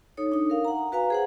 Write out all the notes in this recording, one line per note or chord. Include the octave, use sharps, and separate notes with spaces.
D#4 A4 C#5 D#6
D4 D#4 D#6
A#4 F5
F#5 A#5
F#4 B4 F5 G#5 A#5
G#4 C5 F#5